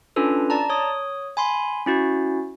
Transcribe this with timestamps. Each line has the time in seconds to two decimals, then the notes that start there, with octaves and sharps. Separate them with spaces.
0.16 C#4 D4 F4 A4 B4
0.50 D5 A5 A#5
0.70 C#5 D#6
1.37 G#5 B5 C6
1.86 C#4 E4 F#4